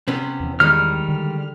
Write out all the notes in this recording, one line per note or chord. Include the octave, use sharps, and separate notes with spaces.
C3 B3 C#4
E2 E3
D#3 G3 G#3 F6
D3